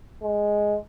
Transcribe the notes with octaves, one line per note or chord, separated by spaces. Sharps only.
G#3